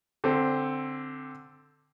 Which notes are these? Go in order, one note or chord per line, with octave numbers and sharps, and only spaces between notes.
D3 C4